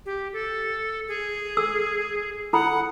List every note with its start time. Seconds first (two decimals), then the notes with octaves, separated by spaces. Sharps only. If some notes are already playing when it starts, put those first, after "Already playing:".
0.06 G4
0.33 A4
1.08 G#4
1.57 A4 E6
2.53 E4 A4 F#5 B5